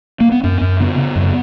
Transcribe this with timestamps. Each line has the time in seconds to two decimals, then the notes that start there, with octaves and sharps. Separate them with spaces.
0.20 A#3
0.32 B3
0.43 F#2 C#4
0.61 F#2
0.80 C#3 B3
0.98 C#3
1.16 F#2